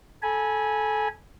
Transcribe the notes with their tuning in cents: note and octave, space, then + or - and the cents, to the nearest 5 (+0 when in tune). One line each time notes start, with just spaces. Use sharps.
A4 -15 G#5 +0 B5 -25